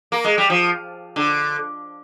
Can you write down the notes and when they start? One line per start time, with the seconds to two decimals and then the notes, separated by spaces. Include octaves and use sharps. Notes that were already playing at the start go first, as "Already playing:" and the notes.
0.12 A#3
0.24 G#3
0.38 G3
0.50 F3
1.16 D3